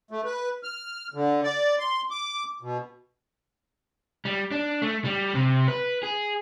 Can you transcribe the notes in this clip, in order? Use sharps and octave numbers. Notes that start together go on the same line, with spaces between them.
A3
B4
F6
D3
D5
C6
D6
B2
G3
D4
A3
G3
C3
B4
G#4